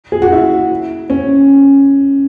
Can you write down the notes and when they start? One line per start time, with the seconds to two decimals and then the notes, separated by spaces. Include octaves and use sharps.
0.12 G#4
0.22 F#4
0.32 E4
1.10 C#4